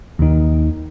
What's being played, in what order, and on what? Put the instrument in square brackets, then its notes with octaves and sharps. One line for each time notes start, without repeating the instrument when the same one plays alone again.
[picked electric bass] D#2 D#3